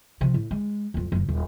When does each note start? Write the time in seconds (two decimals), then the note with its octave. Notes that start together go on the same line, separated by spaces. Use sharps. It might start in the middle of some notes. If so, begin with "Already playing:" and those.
0.21 C3 F3
0.34 A2
0.51 G#3
0.94 D1 F2
1.12 F#1 C#3
1.29 D#1